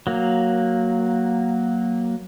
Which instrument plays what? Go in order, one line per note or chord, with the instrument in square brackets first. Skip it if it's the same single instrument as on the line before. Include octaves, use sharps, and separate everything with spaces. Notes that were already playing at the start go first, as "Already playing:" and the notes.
[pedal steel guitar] F#3 A#3